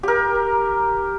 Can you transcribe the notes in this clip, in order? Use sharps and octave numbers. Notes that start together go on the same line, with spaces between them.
G4 A#4